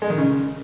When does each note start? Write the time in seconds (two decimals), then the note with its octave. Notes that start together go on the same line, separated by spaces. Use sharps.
0.02 G#3
0.10 D#3
0.18 C#3